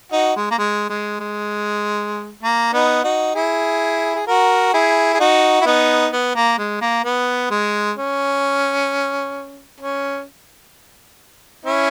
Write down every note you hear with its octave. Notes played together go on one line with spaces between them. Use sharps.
D#4 F#4
G#3
A#3
G#3
G#3
G#3
A#3
B3 D#4
D#4 F#4
E4 G#4
G#4
F#4 A#4
E4 G#4
G#4
D#4 F#4
E4
B3 D#4
B3
A#3
G#3
A#3
B3
G#3
C#4
C#4
C#4 E4